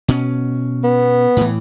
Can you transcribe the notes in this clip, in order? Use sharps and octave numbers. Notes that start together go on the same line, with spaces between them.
B2 C#4
B3
A2 E3